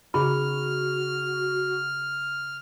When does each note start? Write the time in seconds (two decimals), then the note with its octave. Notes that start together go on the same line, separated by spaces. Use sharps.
0.14 C#3 D#4 F#4 G#4 B5 F6